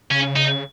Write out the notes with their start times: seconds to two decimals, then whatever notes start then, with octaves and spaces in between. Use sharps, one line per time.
0.11 C#3 C#4
0.36 D#4